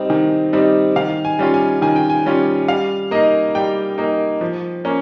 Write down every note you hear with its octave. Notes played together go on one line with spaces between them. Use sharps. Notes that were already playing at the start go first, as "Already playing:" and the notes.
Already playing: G3 C4 D#4
D#3
G3 C4 D#4
D#3 F5
G#5
G3 C#4 F4
G#5
D#3 G#5
G5
G#5
G3 C#4 F4
G3 F5
A#3 D#4 D#5
G3 G5
A#3 D#4
F3
A#3 C#4